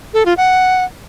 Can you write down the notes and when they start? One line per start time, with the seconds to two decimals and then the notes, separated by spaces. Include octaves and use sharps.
0.14 A4
0.26 F4
0.37 F#5